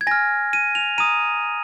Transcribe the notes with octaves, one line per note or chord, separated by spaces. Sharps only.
G#6
G#5 F6 A#6
D#7
F7
A#5 D#6 D#7